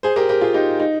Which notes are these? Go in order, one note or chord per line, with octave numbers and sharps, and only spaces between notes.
G#4 C5
G4 A#4
G4 A#4
F4 G#4
D#4 G4
D#4